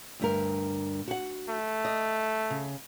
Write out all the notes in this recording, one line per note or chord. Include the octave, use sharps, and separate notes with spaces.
D2 G2 A#4
F#4 F#5
A3
D#5
C#3